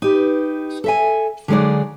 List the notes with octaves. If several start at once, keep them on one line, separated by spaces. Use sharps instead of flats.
D#4 G4 B4
A4 E5 G#5
D3 F#3 G#3 D#4 D5